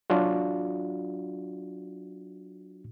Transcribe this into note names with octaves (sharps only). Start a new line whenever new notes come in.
F#3 D4 F4 F#4